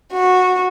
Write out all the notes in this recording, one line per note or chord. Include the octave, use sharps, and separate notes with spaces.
F#4